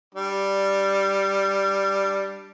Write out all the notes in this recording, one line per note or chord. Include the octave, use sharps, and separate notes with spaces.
G3 D4